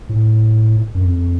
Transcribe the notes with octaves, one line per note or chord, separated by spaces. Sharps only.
A2
F#2
F2